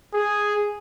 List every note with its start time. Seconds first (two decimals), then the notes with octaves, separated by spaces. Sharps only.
0.14 G#4